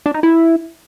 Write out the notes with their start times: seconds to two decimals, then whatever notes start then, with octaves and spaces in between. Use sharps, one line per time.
0.06 D4
0.14 D#4
0.23 E4